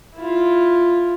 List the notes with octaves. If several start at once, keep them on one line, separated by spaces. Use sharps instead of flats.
E4 F4